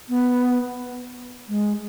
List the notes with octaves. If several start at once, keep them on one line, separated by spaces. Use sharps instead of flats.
B3
G#3